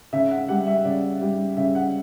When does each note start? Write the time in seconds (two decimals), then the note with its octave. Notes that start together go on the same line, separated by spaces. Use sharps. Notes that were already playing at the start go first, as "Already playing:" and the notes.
0.13 C#3 E5
0.31 F#5
0.48 G3 F#5
0.67 E5
0.85 C#3 D5
1.21 G3
1.57 C#3 E5
1.75 F#5